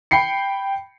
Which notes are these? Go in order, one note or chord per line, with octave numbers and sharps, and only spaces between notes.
G5 B5 C7 C#7